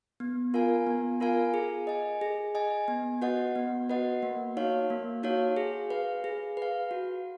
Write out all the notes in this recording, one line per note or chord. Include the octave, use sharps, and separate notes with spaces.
B3
F4 A#4 F5 G#5
B3
F4 A#4 F5 G#5
G#4
D#5 G#5
G#4
D#5 G#5
B3
F#4 B4 D#5 F#5
B3
F#4 B4 D#5 F#5
A#3
D#4 F#4 C#5 F5
A#3
D#4 F#4 C#5 F5
G#4
B4 F5
G#4
B4 F5
F#4